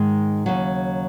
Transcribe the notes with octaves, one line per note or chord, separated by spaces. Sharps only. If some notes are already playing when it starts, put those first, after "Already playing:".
Already playing: G#2 D#3 G#3
D#2 C#3 F#3